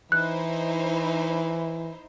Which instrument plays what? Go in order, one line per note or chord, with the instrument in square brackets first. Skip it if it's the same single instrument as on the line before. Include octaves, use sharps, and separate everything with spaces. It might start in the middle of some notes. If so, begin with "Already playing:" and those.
[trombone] E3 [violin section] D#4 E4 C5 [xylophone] F#6